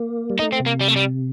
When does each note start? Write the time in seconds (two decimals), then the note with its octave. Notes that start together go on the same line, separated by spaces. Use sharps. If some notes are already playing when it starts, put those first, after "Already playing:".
Already playing: A#3
0.30 G3
0.39 A3 D#4
0.52 C4
0.60 C3
0.66 A#3
0.81 G3
0.88 A3
0.96 G3